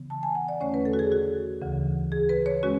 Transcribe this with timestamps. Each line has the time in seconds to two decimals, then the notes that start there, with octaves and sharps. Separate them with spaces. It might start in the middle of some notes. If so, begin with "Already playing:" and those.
Already playing: C#3 E3 B3
0.10 A5
0.23 G#5
0.35 F#5
0.49 D5
0.61 E2 D3 A3 C#4 C#5
0.74 B4
0.85 A4
0.93 F#4
0.99 G#4
1.12 F#4
1.62 D2 C#3 E3
2.12 G#4
2.29 B4
2.46 C#5
2.63 G#3 C#4 F#4